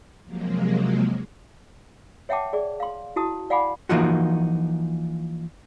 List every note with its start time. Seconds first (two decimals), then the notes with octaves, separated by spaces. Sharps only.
0.25 C3 F3 F#3 G#3 A#3
2.29 C#5 E5 F#5 G5 A5 D6
2.53 G#4 D5
2.80 F5 C6
3.16 E4 F#4 A5 D#6
3.50 D5 F5 F#5 G#5 B5 D6
3.89 E3 F3 A#3 D#4 F4 F#4